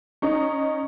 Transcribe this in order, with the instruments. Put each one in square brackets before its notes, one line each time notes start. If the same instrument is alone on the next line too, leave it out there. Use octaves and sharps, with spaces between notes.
[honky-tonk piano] C#4 D#4